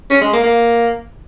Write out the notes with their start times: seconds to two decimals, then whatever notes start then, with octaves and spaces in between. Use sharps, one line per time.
0.10 C#4
0.21 G#3
0.33 A#3
0.43 A#3